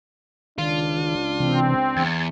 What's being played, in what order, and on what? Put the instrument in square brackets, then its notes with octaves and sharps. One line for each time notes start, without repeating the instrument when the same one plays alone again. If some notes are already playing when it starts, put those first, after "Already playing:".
[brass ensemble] C#2 D4 [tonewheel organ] D#3 [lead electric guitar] F4
[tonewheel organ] C3 E3 [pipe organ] C4
[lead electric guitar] E2 [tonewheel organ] G#6 A6